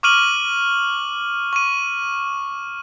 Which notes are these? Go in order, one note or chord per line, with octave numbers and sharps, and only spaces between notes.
C#6 D6 F6 D#7 F#7
C#6 D#7